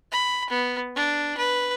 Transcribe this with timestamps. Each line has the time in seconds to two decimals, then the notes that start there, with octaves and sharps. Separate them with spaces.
0.12 B5
0.50 B3
0.96 D4
1.38 B4